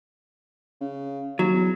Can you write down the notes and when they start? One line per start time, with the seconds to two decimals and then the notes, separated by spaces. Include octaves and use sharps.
0.81 C#3
1.39 D#2 F#3
1.54 E2